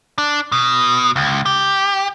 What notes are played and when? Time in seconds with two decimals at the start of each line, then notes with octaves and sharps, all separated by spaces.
0.18 D4
0.52 B2
1.16 C#2
1.46 G4